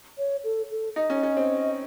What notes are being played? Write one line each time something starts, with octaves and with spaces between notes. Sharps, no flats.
C#5
A4
A4
D#4 D#5
C#4
C#4
C4